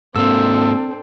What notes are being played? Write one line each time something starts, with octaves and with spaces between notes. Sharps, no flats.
G#2 A#3 C4 D4 A4 E6